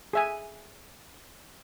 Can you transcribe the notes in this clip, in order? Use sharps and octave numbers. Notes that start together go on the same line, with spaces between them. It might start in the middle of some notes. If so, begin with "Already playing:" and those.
G#4 E5 G#5